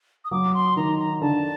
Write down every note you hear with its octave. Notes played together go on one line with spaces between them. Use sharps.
D#6
F#3 D6
C6
D#3 A#5
A#5
D3 A5